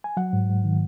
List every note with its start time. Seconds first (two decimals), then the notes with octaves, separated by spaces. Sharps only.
0.04 G#5
0.17 F#3 F#5
0.33 G#2
0.49 G#2
0.64 D#3